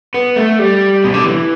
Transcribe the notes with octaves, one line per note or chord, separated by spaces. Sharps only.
B3
A3
G3
B2
D3
E3